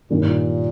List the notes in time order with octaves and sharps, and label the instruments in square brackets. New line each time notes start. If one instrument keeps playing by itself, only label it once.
[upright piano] G2 D#3 G3 A#3 [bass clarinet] A#2
[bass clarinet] A2
A#2